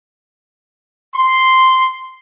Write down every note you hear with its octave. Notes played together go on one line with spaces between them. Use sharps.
C6